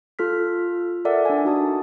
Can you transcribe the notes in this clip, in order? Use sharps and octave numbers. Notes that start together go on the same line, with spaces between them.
F4 A4 F6 B6
A4 A#4 D5 E5 F#5
D4 G#5
D#4 F#4 A5 D#6